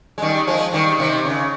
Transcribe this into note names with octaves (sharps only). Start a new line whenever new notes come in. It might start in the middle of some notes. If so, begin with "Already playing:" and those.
G#3
D#3 G3
F3 G#3
D#3 G3
C3 D#3
C#3